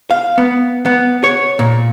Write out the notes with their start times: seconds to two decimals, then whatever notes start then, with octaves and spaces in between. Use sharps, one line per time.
0.11 F5
0.38 B3
0.86 B3
1.24 C#5
1.59 A#2